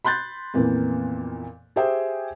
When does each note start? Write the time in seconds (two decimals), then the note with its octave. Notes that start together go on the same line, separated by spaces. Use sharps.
0.05 B5 C6 F#6 G6 A6
0.54 F2 A#2 E3 A#3 B3
1.76 G4 G#4 C5 E5 G5 G#5